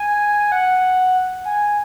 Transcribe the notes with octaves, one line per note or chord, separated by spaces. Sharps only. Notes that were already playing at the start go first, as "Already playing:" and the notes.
Already playing: G#5
F#5
G#5